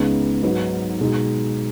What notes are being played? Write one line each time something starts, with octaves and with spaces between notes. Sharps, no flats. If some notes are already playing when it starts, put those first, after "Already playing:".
Already playing: C#2 C#3 G#3 B3 D#4
G#2 F#3 D#4 B4
B2 G#3 D#4